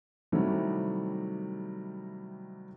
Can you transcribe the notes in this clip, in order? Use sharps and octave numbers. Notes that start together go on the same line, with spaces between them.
C3 D#3 F#3 G3 A3 E4